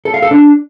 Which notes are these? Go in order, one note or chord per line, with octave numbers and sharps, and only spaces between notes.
A4
F5
A4
D4